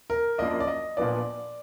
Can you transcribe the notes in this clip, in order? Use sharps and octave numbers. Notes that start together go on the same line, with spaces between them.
A#4
F#2 F3 A#3 D4 D#5
D5
D#5
A#2 F3 B3 D4 D5